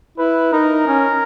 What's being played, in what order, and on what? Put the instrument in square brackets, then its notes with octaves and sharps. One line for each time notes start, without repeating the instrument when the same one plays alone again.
[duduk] E4 [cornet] B4
[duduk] D#4 [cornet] A#4
[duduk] C#4